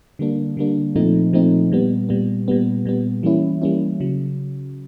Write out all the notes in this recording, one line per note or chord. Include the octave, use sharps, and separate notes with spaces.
D3 G3 A#3 D4
D3 G3 A#3 D4
A#2 F3 A3 C4 D#4
A#2 F3 A3 C4 D#4
A#2 G3 B3
A#2 G3 B3
A#2 G3 B3
A#2 G3 B3
E3 G3 A#3 C#4 E4
E3 G3 A#3 C#4 E4
C#3 F#3